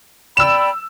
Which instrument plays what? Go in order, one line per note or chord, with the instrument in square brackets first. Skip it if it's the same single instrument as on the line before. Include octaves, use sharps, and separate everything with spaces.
[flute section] D5 G5 B5 [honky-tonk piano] E6 E7